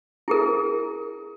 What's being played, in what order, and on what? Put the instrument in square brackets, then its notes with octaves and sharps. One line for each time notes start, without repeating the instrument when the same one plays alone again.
[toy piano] E4 G#4 A#4